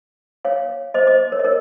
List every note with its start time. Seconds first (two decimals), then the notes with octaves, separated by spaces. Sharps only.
0.45 C#5 F5
0.94 C5 D#5
1.07 C5 D#5
1.32 A#4 C#5
1.39 D#5
1.44 A#4 C#5